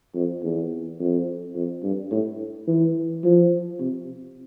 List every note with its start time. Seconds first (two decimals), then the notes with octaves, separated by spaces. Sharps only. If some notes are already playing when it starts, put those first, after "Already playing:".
0.15 F2
0.43 E2
1.00 F2
1.55 F2
1.83 G2
2.11 A2
2.68 E3
3.24 F3
3.80 C3